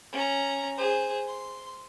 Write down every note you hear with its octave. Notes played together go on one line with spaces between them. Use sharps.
C#4 A#5
G#4 C5
C6